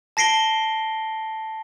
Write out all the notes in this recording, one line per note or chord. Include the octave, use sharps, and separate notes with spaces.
A5 A#6 C7 D7 G7